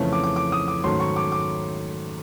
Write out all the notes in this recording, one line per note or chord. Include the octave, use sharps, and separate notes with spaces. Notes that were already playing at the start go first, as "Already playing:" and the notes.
Already playing: F2 C#3 E3 A3 C#4
D6
D6
D6
D#6
D6
G#2 D#3 F#3 A3 C#4 C6
C#6
D6
D6